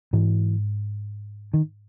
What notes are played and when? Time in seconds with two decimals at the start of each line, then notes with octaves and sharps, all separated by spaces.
0.13 G#2 E3
1.54 D#3